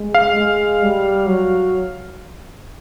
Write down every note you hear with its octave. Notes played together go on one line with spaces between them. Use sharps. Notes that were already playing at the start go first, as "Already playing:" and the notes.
Already playing: G#3
F5
G#3
G3
F#3